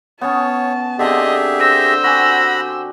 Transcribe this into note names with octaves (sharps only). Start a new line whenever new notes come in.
B3 C#4 C#5 A5
D3 C4 G4 G#4 D#5 E5
C5 E6 A#6
F#4 G4 F#5 G#5 B5 A#6